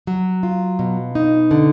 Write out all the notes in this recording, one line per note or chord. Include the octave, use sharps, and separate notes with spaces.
F#3
F4
B2
D#4
D3